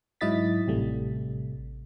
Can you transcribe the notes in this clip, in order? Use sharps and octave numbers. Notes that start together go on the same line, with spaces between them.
G#2 F#3 E4 D#5 A6 B6
A1 C3 G3 A3